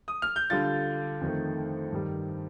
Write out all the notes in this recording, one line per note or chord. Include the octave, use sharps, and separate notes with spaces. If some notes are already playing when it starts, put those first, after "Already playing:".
D#6
F6
G6
D3 G3 D4 F4 A6
F2 D#3 A3
G2 D#3 G3